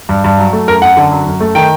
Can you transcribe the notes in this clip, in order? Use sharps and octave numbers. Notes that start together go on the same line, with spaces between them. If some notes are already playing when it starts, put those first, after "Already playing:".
G2
G2
F#3
A3
F#2 A#4
F#2 F#5
D3
F#3
F#2
A3
D#3 G5